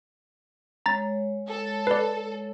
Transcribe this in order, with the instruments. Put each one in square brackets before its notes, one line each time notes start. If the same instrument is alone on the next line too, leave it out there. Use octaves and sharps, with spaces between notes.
[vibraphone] G#3 C#5 [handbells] A#5 A6
[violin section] A4
[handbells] B4 D5